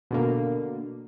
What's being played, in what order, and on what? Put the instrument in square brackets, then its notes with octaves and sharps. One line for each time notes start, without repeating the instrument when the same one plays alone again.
[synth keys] B2 D3 A#3